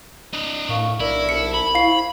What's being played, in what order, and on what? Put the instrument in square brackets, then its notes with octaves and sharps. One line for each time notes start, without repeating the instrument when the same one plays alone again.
[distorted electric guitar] D4 D#5
[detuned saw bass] A2 [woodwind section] A#3 F5 C#6
[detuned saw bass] B1 [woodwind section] D4 A#4 [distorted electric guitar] E4
[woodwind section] C2 A5 [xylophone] C#7
[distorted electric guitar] B5
[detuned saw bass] E4 [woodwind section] C5 C#6 [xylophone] F5 C7